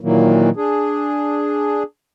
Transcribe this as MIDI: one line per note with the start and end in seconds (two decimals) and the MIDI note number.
0.01 0.50 46
0.01 0.50 51
0.01 0.50 52
0.01 0.50 54
0.01 0.50 58
0.56 1.83 62
0.56 1.83 68